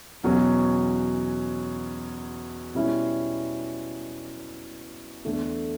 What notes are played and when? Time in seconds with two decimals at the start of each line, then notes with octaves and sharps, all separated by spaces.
0.23 E2 B2 F#3 C#4 F#4
2.74 B2 G3 C#4 E4
5.25 E2 D3 A3